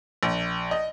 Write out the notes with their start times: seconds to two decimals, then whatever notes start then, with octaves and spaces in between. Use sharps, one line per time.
0.23 A#1
0.71 D#5